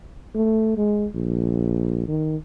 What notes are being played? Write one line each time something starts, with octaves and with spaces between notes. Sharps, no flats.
A3
G#3
A#1
D#3